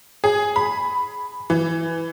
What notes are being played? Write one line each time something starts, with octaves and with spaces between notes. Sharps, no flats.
G#4
B5
E3